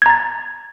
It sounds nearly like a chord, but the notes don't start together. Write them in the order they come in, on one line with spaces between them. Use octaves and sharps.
G#6 A#5 A6